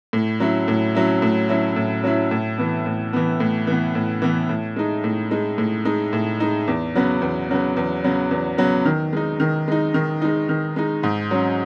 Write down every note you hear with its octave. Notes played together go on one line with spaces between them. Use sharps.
A2
F#3 C#4 E4
A2
F#3 C#4 E4
A2
F#3 C#4 E4
A2
F#3 C#4 E4
A2
E3 B3
A2
E3 B3
A2
E3 B3
A2
E3 B3
A2
G#3 D#4
A2
G#3 D#4
A2
G#3 D#4
A2
G#3 D#4
E2
C#3 F#3 B3
E2
C#3 F#3 B3
E2
C#3 F#3 B3
E2
C#3 F#3 B3
D#3
G#3 D#4
D#3
G#3 D#4
D#3
G#3 D#4
D#3
G#3 D#4
G#2
F#3 C#4